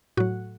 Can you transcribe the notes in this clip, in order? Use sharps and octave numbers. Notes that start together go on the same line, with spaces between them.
A2 F#3 F#4